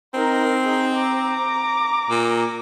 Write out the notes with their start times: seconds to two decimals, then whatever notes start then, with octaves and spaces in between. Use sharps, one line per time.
0.14 C4 D#4 A#4
0.64 D#4 G#4
0.95 A#5 D6
2.10 A#2